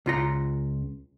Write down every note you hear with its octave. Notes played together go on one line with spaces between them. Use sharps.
C#2 F4 A#5